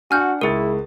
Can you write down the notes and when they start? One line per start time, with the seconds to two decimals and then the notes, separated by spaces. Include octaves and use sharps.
0.11 D4 F#4 F#5 G#5 F6 G6
0.41 C#2 E4 G#4 A#4 A6